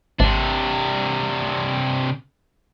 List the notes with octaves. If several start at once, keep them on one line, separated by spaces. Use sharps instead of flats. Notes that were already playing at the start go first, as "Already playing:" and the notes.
G#1 C3 D4